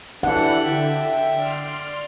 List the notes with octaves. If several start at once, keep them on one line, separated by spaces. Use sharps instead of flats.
E3 D4 E4 G4 A4 F#5
D3 E5 G5
D5 C6 F6